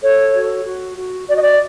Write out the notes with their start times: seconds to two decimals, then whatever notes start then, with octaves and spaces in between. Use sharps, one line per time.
0.02 A4 C#5
0.34 F#4
0.65 F#4
0.97 F#4
1.29 F#4 D5
1.36 D#5
1.43 D5